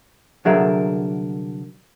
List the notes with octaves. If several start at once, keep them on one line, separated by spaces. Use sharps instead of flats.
C2 D3 F#3 G#4 A#4 E5